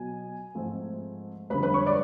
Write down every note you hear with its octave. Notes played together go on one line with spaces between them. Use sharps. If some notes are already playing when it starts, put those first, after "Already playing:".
Already playing: B2 F#3 B3 G#5
G#2 F3 A3 C4
G2 D3 F3 G#3 B4 B5
B4 B5
C#5 C#6
D5 D6